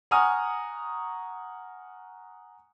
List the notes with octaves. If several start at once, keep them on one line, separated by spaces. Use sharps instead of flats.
F#5 G#5 A#5 C#6 D#6 F6